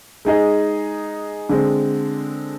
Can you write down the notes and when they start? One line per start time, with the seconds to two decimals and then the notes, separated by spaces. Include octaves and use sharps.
0.25 G#3 D#4 G#4 D#5
1.49 D3 G#3 C4